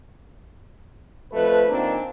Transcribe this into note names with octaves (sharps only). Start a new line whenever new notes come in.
F2 F3 A3 B4
A#2 D#3 A#3 C4 D4